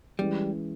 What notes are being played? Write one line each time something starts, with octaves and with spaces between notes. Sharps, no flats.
E3 G3 G#3 C#4